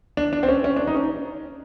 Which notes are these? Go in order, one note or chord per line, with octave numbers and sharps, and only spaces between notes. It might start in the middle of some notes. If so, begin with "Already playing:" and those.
D4
D4
C4
C#4
C#4
D4
D#4
C#4